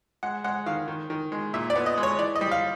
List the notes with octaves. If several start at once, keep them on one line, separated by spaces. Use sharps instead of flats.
G#3 F#5
G#3 F#5
D#3 F5
D#3
D#3
G#3
A#2 E5
D5
B3
D#5
G#3
C#5
E3 D5
D#5
G3
F5